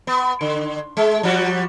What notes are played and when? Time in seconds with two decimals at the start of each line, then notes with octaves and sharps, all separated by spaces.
0.07 B3
0.41 D3
0.97 G#3
1.23 F3 G3 F#4